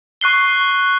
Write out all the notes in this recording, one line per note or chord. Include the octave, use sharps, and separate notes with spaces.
C#6 F#6 C7 G7